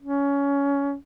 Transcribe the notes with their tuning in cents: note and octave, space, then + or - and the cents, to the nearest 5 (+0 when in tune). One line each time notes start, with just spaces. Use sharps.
C#4 +20